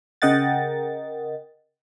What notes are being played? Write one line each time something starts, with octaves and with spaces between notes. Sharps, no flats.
C#3 A#4 D#5 F#5 G5 A6